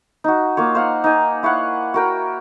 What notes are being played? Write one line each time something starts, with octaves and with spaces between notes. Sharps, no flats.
D#4 F#4
A#3 F4 C#5
C5 F5 F#5
D#4 G#5
E4 C#5 F5 F#5
F#4 A#4 G5